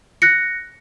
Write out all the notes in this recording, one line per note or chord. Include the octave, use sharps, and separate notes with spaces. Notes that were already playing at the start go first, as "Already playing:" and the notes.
F#6 A#6 C#7